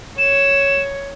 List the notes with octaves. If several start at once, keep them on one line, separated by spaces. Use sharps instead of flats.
C#5 E7